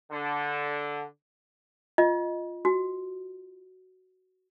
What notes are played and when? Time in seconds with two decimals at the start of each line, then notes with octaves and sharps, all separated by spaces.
0.12 D3
1.98 F4 D#5
2.65 F#4